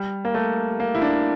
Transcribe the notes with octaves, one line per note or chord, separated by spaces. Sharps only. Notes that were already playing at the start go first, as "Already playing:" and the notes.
Already playing: G3
A#3
A3
A#3
E4
D4